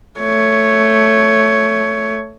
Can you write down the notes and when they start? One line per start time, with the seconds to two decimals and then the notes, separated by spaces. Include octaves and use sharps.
0.20 A3 C#5